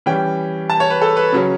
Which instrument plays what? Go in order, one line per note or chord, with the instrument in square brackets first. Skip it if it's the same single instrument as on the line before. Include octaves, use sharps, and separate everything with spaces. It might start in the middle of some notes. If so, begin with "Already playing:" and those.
[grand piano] E3 G3 C#4 G5
A5
C#5
B4
A4
B4
C#3 F#3 C#4